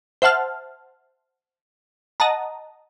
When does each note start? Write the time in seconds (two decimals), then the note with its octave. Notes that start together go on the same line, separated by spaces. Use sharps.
0.22 C5 E5 F#5 A5 F6
2.20 D#5 F#5 A5 A#5